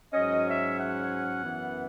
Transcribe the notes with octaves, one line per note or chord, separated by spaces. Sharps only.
G#2 F#3 C#4 D#5
E5
F#5
F#2 E3 B3